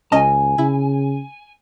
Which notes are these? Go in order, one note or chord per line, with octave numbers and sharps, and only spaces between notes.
C#2 C#4 D#5 G#5 A5
C#3 E4